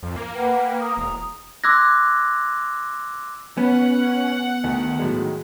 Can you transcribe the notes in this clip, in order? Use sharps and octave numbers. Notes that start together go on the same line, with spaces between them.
F2
A#3
B4 F#5 G5
A#5 D#6
E1
C6 D6 E6 F#6 G#6 A#6
B3 C#4 F#5
D2 D#3
A2 F#3 G#3